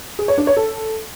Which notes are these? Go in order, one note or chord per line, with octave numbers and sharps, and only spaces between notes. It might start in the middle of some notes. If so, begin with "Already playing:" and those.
G#4
C#5
D4
C#5
A4